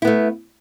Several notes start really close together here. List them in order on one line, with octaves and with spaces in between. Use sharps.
E4 B3 A3